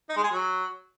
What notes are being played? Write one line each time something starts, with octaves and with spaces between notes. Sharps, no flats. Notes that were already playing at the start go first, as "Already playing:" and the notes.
D#4
G#3
G#4
F#3